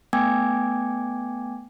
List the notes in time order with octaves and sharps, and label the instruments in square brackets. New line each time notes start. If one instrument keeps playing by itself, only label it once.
[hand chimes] A3 B3 G5 G#5 D6 G#6